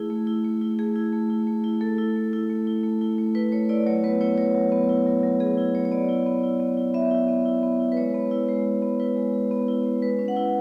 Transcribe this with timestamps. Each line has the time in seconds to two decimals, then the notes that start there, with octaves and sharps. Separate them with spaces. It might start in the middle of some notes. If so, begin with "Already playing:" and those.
Already playing: A3 E4 G#4
0.10 A3
0.27 E4
0.44 A3
0.61 E4
0.79 A3 G#4
0.96 E4
1.13 A3
1.30 E4
1.47 A3
1.64 E4
1.81 A3 A4
1.98 E4
2.16 A3
2.33 E4
2.50 A3
2.67 E4
2.83 A3
3.01 E4
3.18 A3
3.35 E4 B4
3.52 A3 C#5
3.69 E4 D5
3.86 F#3 C#5
4.04 B3 B4
4.21 E4 C#5
4.38 F#3 C#5
4.55 F#3
4.72 B3
4.89 E4
5.06 F#3
5.23 F#3
5.40 B3 G#4
5.57 E4
5.75 F#3 C#5
5.85 C#5
5.92 B3 D5
6.09 E4
6.26 B3
6.43 E4
6.60 B3
6.77 E4
6.94 B3 E5
7.11 E4
7.28 B3
7.45 E4
7.63 B3
7.80 E4
7.92 B4
7.97 G#3 C#5
8.14 B3
8.31 E4
8.48 G#3
8.65 G#3
8.82 B3
9.00 E4 B4
9.17 G#3
9.34 G#3
9.51 B3
9.68 E4
9.86 G#3
10.02 G#3 B4
10.19 C#4
10.28 F#5
10.37 E4